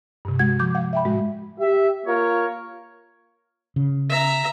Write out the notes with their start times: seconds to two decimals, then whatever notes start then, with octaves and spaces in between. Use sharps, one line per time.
0.25 G2 C3
0.39 G#3 F#4 F#5 G#6
0.59 F3 D6 G6
0.75 F5 F#5
0.93 E5 G5 B5
1.05 A2 G#3 F#4
1.59 G4 E5
2.06 A#3 F4 A#4 C#5
3.76 C#3
4.09 E5 A#5